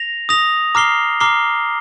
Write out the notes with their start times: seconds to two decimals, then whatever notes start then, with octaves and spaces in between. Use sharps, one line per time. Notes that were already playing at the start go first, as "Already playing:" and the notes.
Already playing: A#6 F7
0.29 D#6 A#6 F7
0.75 A#5 D6 F6 C7 G7
1.20 A#5 D6 F6 C7 G7